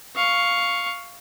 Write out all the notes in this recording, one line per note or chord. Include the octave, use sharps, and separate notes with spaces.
F5 C#6